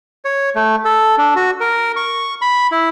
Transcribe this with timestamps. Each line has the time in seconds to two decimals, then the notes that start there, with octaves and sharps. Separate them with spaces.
0.25 C#5
0.55 A3
0.85 A4
1.18 D4
1.36 F#4
1.60 A#4
1.96 C#6
2.42 B5
2.72 E4